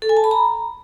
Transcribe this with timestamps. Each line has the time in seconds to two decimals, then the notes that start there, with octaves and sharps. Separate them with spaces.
0.02 A4
0.09 G#5
0.17 A5
0.24 B5
0.31 A#5